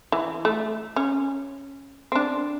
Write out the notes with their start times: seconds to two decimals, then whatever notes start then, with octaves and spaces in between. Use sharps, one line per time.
0.12 E3
0.45 A3
0.96 C#4
2.12 C4 D4